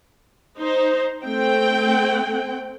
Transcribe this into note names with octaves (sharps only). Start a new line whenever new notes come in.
D#4 C5
A3 C4 G5